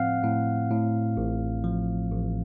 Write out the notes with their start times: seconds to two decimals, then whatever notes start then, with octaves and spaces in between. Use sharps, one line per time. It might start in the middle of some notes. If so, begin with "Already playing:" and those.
Already playing: A2 F3 C4 F5 F#5
0.23 A2
0.71 A2
1.17 A1
1.64 F3
2.11 A1